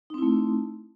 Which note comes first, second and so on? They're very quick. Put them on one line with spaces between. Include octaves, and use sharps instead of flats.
D#4 C4 E4 A3